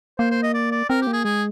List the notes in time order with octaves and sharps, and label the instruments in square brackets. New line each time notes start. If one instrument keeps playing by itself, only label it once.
[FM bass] A#3 [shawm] C5
[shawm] C5
D#5
D5
D5
[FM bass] C4 [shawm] A#4
[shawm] G4
[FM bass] A#3
[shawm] G#4
[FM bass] G#3 [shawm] G#4